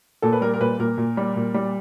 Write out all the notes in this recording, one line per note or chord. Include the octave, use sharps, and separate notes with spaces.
A#2 A4
B4
G3 A#4
A#4
A#2 B4
A#2 A#4
A#2
G3
A#2
G3